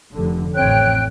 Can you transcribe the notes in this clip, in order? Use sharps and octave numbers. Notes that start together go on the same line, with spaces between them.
F1 D3
A1 F2 C4 C#5 G5 F#6